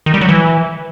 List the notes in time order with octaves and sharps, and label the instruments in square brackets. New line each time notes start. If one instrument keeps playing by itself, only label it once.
[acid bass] D#3
G3
F#3
E3